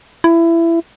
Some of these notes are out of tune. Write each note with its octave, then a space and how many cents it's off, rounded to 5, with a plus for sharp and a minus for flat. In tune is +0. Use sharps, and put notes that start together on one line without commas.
E4 +20